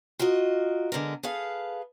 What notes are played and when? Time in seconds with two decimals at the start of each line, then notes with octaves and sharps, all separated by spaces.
0.19 F4 F#4 A#4 D#5
0.92 D3 G#3 B3 A#4
1.23 G#4 A4 B4 F5